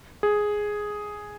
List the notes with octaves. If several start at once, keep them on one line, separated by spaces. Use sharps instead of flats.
G#4